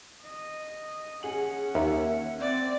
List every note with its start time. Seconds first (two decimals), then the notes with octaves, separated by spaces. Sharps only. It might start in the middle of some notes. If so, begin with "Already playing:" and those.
0.23 D#5
1.23 C#4 G#4 F#5 F#7
1.75 D#2 E5
2.40 C4 D5